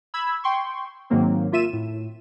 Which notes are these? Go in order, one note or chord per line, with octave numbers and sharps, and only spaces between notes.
B5 E6 G#6
G5 C6 C#6
G#2 D#3 F#3 A#3 C4
A#3 F4 E5 D#7 E7
A2